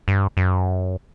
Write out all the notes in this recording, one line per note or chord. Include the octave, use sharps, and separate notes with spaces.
G2
F#2